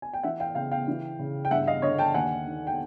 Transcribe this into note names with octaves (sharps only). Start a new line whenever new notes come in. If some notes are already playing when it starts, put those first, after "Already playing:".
G#5
G5
E3 E5 F#5
F5 G5
C#3 F5 G5
F5 G5
E3
C#3
G5
G2 E5 F#5
D#5 F5
D3 C#5 D#5
G5 A5
D#2 F#5 G#5
D#3
G5